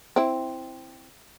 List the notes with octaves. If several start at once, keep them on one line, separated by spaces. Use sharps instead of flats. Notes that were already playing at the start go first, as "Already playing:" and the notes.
C4 E4